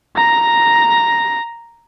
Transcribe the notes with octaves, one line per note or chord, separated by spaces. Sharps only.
A#5 A#6